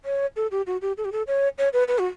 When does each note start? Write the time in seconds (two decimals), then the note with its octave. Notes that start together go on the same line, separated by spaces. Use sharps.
0.05 C#5
0.36 A4
0.51 G4
0.67 F#4
0.82 G4
0.98 A4
1.05 G4
1.12 A4
1.27 C#5
1.58 C#5
1.73 B4
1.88 B4
1.99 F#4